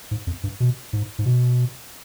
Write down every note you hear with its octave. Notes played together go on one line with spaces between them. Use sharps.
G#2
F2
G2
B2
G#2
G#2
B2